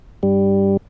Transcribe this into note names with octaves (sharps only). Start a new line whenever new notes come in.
G2 G3